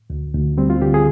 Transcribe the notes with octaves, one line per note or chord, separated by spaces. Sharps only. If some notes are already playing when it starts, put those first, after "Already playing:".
D2
D2
G3 C4
F4
D3 G4
G#4